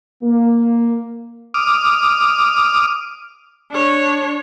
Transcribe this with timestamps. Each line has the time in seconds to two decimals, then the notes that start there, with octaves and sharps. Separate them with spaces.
0.23 A#3
1.54 D6 D#6 F6
3.71 D4 C#5